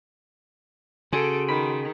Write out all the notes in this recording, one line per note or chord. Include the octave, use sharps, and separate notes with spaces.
C#3 F#4 G#4 A4 C6 D7
D#3 B5